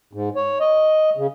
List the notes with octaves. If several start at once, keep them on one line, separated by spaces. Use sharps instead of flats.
G#2
C#5
D#5
C#3